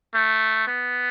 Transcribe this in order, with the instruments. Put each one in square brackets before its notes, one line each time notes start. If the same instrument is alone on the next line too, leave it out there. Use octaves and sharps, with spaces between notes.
[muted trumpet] A3
B3